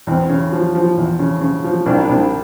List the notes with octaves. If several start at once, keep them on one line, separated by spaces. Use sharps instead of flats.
E2 C4
C#3
F3
F3
E2
C#3
C#3
F3
C2 D4
D#4
C2 D4